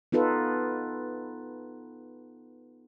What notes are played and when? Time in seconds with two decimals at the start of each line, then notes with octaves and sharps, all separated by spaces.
0.12 B3 D#4 F4 A4 B4